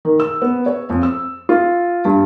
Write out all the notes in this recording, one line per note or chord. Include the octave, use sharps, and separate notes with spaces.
D#3
E6
B3
C#5
F2
E6
F4
G2